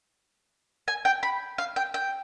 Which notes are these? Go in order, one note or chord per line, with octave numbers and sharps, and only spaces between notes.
G#5
G5
B5
F5
G5
G5